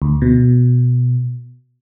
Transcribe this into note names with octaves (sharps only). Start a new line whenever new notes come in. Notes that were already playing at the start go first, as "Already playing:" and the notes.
D2
B2